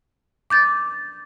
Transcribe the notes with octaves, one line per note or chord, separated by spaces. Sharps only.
D6 G6 A6